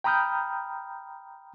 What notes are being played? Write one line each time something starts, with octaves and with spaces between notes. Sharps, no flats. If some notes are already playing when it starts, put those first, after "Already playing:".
G5 A#5 B5 D#6 F6 G6